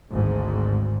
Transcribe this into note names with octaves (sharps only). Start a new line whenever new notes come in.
G#1 D2 G#2